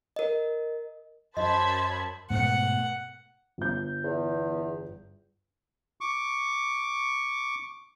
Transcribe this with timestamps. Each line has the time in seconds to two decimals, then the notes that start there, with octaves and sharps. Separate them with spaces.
0.16 A#4 D#5
1.37 F#2 C5 D#5 A5 B5 G#6
2.30 G#2 B2 A3 F#5
3.58 G1 G6
4.04 E2
6.01 C#6 D6